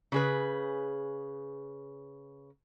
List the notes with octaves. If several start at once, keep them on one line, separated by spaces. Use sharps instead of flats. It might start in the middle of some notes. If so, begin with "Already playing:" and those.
C#3 G#4 B4